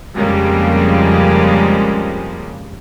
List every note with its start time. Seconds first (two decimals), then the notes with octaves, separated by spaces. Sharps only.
0.16 F2 C#3 F3 G3 G#3 A#3